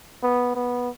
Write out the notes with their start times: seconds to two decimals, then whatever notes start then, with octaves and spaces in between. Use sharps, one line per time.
0.23 B3
0.55 B3